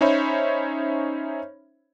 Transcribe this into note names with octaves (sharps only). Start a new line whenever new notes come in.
C#4 D#4 C5 C#5 E5 B5